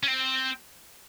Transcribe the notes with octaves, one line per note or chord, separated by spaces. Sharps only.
C#4
C4